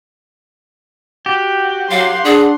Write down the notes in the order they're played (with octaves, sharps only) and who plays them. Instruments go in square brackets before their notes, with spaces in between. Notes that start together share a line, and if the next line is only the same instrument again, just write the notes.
[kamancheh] F#4 [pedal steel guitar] G4
[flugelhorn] F#3 [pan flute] F5 [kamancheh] F#5 C6
[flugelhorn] D4 [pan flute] G#4